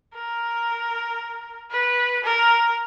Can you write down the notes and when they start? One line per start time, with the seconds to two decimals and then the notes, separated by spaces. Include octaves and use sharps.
0.14 A#4
1.71 B4
2.24 A#4